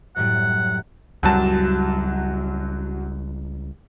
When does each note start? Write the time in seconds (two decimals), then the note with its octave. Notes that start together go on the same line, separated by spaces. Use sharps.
0.16 F#2 A2 G3 F#5
1.23 C#2 F#2 F#3 G3 A5